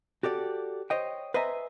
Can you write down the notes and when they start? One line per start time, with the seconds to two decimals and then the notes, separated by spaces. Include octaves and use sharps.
0.23 F#4 G4 A4 D5
0.90 C5 C#5 D#5 G5
1.34 B4 C5 D#5 E5 G#5 A#5